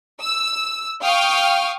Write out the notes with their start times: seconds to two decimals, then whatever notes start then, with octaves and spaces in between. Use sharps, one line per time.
0.21 E6
1.03 F5 G5 C#6 D#6 F6